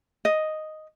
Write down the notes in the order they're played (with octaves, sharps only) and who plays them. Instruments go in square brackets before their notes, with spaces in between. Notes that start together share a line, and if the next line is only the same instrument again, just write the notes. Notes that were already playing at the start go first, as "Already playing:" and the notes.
[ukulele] D#5